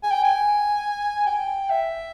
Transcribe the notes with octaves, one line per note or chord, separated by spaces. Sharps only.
G#5
G5
G#5
G5
E5